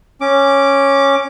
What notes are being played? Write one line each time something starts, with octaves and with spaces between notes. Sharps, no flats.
C#4 D6